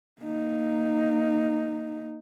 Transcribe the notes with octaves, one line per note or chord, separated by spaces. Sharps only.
A#3 D#4